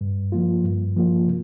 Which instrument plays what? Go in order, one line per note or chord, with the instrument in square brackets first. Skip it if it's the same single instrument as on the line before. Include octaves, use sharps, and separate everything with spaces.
[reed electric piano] G2
F3 A#3 F4
G2
F3 A#3 F4
C3